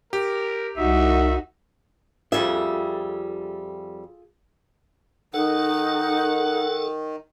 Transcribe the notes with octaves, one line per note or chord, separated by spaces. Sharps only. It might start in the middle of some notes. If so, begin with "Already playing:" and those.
G4 A#4
C2 D#4 F#4 E5
F2 G3 F4 G#4 A4 E5
D#3 D#4 A4 F#5